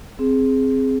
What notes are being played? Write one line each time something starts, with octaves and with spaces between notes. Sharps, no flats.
C4 G#4